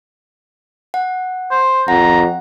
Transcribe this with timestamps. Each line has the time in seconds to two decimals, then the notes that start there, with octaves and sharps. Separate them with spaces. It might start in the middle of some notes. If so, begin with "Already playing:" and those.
0.94 F#5
1.51 C5
1.88 F2 F#5 A#5